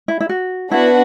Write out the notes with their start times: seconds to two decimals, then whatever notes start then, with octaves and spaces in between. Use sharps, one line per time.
0.08 E4
0.20 E4
0.29 F#4
0.71 B3 D4 E4 F#4 B4 F#5